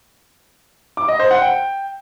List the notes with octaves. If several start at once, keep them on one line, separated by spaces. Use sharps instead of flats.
D6
D#5
C5
F#5
G5